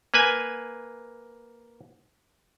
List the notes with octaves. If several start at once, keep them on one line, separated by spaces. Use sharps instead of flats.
A#3 B4 G#5